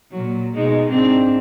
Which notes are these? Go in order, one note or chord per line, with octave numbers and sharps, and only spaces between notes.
A#2 F#3
B2 G#3 D#4
G#2 C4 D4